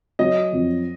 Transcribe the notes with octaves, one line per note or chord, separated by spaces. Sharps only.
F#3 D#5
F2